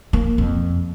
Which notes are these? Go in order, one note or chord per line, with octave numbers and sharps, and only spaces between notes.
A#3
F2